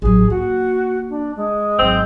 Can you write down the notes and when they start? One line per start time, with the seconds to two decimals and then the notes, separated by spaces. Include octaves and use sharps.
0.02 A1 F#3 G#4
0.30 A#3 F#4
1.09 D4
1.36 G#3
1.79 G#1 F#3 C4